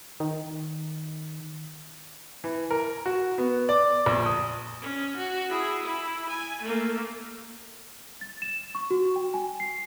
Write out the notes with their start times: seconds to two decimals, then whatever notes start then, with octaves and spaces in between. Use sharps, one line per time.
0.20 D#3
2.44 E3
2.71 A#4
3.06 F#4
3.38 B3
3.69 D5
4.06 A#1
4.26 D#6
4.82 C#4
5.17 F#4
5.50 E4 G#4
5.84 E4
6.30 G#5
6.62 A3 A#3
8.21 A6
8.42 E7
8.75 C#6
8.91 F#4
9.16 G5
9.34 G#5
9.60 C7